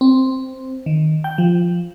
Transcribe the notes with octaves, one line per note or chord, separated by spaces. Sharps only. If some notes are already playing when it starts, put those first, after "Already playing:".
C4
D#3
G5
F3